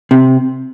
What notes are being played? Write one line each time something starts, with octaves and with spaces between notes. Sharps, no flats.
C3